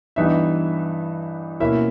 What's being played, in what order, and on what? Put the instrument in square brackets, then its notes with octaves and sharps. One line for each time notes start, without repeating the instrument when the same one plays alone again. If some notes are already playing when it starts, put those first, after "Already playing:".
[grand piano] G2 E3 G3 B3 D#4 E5
B2 A#3 C#4 E4 E5